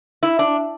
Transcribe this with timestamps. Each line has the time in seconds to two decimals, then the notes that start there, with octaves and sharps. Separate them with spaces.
0.23 E4
0.39 D4